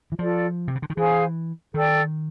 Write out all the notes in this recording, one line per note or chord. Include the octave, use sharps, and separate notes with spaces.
E3
F3 F4 A4 D5
C3
C#3
D3
D#3
E3 G#4 C5 F5 G#5
D#3 A4 D5 G5